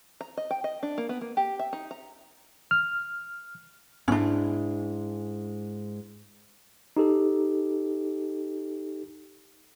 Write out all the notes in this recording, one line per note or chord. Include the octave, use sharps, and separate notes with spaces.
A#5
D#5
G5
D#5
D4
A#3
B3
A#3
G4
E5
D#4
A#5
F6
G#2 G#3 C#4 D4 E4
D#4 G4 A4